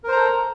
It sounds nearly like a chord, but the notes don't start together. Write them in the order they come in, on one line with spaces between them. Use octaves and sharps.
A#4 C5 A#5 A4